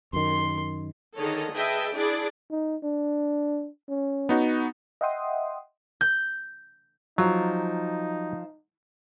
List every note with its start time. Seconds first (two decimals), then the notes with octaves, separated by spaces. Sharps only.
0.13 F#2 D#3 C6
1.16 D3 D#3 G#4 A4 C#5 D#5
1.52 G#4 B4 D#5 E5 G5 A5
1.93 D4 E4 G#4 D5
2.51 D#4
2.84 D4
3.89 C#4
4.29 B3 D#4 F#4
5.01 D#5 E5 F#5 G5 C6 D#6
6.01 G6
7.18 F3 F#3 D#4 F4